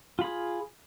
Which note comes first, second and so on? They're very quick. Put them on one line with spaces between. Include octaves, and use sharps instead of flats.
F4 B5 G#4